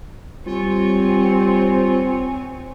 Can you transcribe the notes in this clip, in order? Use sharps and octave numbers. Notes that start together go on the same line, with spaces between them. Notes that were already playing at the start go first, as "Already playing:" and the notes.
G3 C4 F4 C#5 G#5